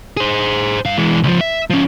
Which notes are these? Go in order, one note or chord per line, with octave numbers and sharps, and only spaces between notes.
G#4 C5
G2 F5
E3 G#3
C#2 F3
E5
F3 C#4